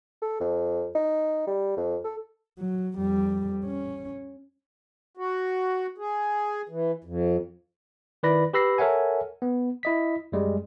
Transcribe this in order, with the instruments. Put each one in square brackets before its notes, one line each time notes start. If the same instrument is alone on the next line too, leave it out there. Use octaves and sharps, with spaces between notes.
[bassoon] A4
F2
D#4
G3
F2
A4
[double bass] F#3
F2 G3
C#4
[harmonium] F#4
G#4
E3
F2
[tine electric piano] D#3 E4 B4 D5 B5 A#6
G4 B4 B5 E6 A#6 C7
A4 A#4 C#5 E5 F#5 G#5
B3
E4 D#5 B6
F#2 G3 G#3